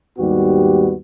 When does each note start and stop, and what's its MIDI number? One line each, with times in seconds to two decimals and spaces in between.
0.18 0.95 39
0.18 0.95 44
0.18 0.95 55
0.18 0.95 59
0.18 0.95 66
0.18 0.95 67